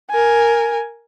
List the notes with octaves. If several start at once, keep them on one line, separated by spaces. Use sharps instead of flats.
A#4 G#5